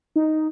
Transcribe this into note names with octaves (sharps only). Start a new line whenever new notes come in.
D#4